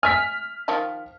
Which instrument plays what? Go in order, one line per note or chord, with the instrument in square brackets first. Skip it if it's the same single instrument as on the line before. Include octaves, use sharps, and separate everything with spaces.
[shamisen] E5 G#5 [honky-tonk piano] F6 B6
[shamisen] D#3 F3 A5